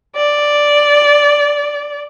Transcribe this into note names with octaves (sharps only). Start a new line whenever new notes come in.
D5